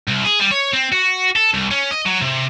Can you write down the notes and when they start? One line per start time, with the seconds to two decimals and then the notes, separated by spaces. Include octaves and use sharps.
0.08 C2
0.25 G#4
0.40 G3
0.51 C#5
0.73 C4
0.92 F#4
1.36 A4
1.54 C2
1.71 C#4
1.91 D#5
2.06 F#3
2.22 C3